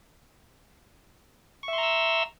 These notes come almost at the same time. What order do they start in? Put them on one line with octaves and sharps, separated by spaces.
C#6 E5 C6 A#5 E6